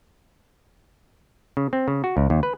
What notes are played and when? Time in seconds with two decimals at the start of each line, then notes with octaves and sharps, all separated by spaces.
1.57 C#3
1.73 C4
1.88 C#3
2.04 F#4
2.17 C#2
2.30 D#2
2.43 B4